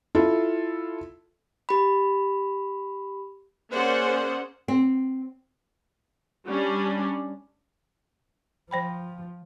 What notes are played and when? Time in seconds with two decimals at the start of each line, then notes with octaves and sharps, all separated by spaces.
0.15 E4 F4 A4
1.69 G4 B5
3.73 A#3 C#4 G#4 C5 D5 F#5
4.68 C4
6.47 G3 C#4 D4
8.71 F3 C5 G5 B5